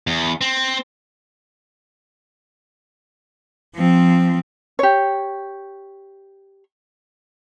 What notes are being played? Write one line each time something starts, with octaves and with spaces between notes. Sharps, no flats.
E2
C4
F3 C4
G4 C#5